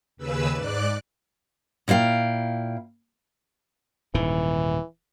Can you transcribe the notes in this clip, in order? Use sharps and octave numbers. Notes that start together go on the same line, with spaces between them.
D#2 C#3 B4 E6
G#2 D5 D6 F#6
A#2 E4 C5 F5 G5
D#1 G#2 D#3 E3